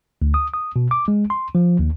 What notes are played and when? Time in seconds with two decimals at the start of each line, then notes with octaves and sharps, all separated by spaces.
0.22 D2
0.34 D#6
0.54 D#6
0.76 B2
0.91 D6
1.08 G#3
1.30 C6
1.55 F3
1.79 D#2